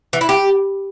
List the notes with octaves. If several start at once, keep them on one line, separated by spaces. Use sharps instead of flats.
E3
E4
G4